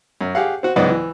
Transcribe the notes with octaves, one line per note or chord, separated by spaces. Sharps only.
F#2
G4 G#4 F5 F#5
C4 F#4
C#2 G#2 F#3 B3 D5 D#5
E3